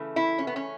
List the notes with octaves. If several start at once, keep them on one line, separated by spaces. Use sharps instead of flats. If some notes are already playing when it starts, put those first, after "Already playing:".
Already playing: C#3 E3 A3
E4
C#4
B3
C#4